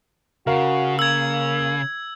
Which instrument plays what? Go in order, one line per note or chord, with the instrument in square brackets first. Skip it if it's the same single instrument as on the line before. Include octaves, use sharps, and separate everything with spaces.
[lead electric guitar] C#3 [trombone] F#4 [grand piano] A#4 F5
[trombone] A#3 [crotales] E6 G#6